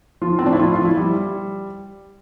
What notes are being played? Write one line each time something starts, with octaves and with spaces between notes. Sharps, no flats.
F3 F4
C4
A2 D4
E4
F3 F4
F4
F3
E4
F3 G3